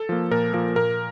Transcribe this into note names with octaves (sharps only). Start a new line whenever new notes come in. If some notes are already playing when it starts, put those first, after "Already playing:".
Already playing: A4
F3 A#3
A#2 A#4
F3 A#3 A#4
A#2 A#4